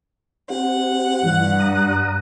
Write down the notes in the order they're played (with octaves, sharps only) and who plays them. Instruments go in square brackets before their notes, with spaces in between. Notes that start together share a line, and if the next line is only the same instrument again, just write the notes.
[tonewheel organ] C4 G4 [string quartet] F#5
[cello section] G2 [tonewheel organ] E3 [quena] F#6
[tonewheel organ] A#5 D#6